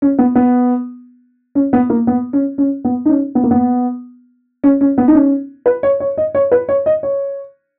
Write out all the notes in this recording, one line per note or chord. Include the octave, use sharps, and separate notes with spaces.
C#4
B3
B3
C#4
B3
A#3
B3
C#4
C#4
B3
D#4
C#4
B3
A#3
B3
C#4
C#4
B3
D#4
C#4
B4
C#5
C#5
D#5
C#5
B4
C#5
D#5
C#5